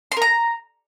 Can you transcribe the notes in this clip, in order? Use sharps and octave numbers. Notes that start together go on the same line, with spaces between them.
C6
A#4
A#5